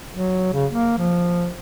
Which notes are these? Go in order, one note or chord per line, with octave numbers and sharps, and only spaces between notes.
F#3
C#3
A#3
F3